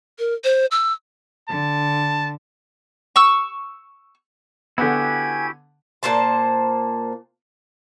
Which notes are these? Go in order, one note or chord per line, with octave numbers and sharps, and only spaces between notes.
A#4
C5
E6
D3 A5
C#6 E6
D3 B3 E4 F#4 G4 G#5 G#6
A#2 A#3 C5 A5